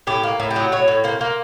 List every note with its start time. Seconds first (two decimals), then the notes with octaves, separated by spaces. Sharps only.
0.07 A2 G4
0.23 A#3
0.40 A2
0.51 G4
0.56 F#3
0.72 A2 C#5
0.88 A2
1.04 A#3 C5
1.21 A#3